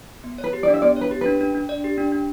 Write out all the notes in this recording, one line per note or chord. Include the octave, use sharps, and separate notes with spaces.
B3
C#5
B4
G4
D5
D4
E5
B3 D5
C#5
B4
G4
D4 B4
D4
D4
D5
G4
D4
D4